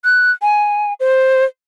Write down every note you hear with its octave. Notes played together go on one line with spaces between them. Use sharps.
F#6
G#5
C5